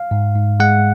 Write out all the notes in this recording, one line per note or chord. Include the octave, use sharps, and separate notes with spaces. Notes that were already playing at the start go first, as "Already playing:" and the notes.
Already playing: F5
G#2
G#2
G#3 F#5